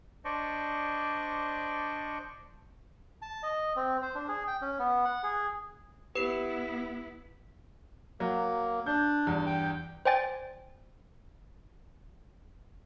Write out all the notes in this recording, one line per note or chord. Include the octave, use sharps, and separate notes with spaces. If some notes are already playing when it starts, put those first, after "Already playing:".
D4 C5 D5 D#5 C#6
A5
D#5
C4
C5
D4
G#4
G5
C#4
B3
F#5
G#4
B3 E4 G4 B4 C7
F#3 A#3
D4 G6
E2 G2
G5
C5 D5 G5 G#5 A6